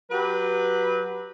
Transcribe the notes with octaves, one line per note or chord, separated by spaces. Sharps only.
F#3 G4 B4